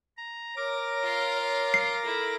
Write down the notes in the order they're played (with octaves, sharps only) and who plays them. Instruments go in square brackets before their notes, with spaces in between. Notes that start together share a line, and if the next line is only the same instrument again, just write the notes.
[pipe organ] A#5
[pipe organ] A#4 D6 A#6 [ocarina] C#5
[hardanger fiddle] F4 F5
[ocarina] C#5
[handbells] C7
[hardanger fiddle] E4 [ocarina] A4